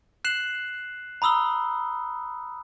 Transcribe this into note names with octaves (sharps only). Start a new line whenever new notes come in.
F#6 C7 E7 F#7
A#5 B5 D#6 E6 G7